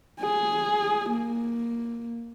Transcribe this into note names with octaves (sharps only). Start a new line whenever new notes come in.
G#4
A#3